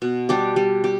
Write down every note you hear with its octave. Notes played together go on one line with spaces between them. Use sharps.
B2
G3 D4 G4
G3
G4